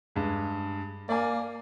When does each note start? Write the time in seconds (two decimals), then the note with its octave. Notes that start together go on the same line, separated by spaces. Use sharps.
0.16 G2 G#3
1.09 A#3 D5 G#5